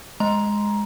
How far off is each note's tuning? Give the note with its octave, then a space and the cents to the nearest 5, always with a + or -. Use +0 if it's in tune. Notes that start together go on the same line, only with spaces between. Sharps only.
G#3 +0 A#5 +15